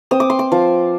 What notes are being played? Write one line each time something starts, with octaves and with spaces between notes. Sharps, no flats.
C4 D#6
D6
C6
D6
F3